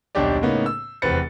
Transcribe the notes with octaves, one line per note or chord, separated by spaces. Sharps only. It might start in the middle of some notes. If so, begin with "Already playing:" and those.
D#1 B1 D4 G4 D5
A2 C#3 A#3 B3 C#4 D#4
E6
F1 E2 C4 B4 A6 C#7